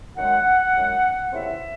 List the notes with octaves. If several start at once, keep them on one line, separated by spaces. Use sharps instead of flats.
F#2 D#3 G#3 F#5
F#2 D#3 G#3
D#2 C#3 E3 C4 E4 E5